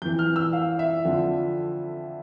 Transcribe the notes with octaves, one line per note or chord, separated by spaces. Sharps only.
F2 E3 G6
F6
E6
F5
E5
F2 D3 F3